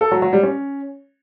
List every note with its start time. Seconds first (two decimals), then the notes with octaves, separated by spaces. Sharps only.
0.01 A4
0.11 F#3
0.22 F#3
0.33 G3
0.43 C#4